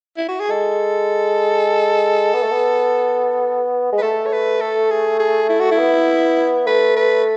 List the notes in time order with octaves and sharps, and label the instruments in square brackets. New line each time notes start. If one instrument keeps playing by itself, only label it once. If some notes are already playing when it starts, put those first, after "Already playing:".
[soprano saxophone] E4
F#4
G#4
[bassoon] G#3 [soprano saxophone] A4
[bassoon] B3
A3
B3
G#3
[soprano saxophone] B4
[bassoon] A3 [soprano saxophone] A4
[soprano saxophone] C#5
B4
A4
G#4
G#4
E4
F#4
E4
[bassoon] B3
[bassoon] A3 [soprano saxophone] B4
[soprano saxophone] B4